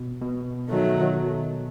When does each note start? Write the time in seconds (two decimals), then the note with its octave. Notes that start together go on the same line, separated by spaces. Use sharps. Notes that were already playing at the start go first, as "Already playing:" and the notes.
Already playing: B2
0.22 B2
0.69 D#3 F#3 A3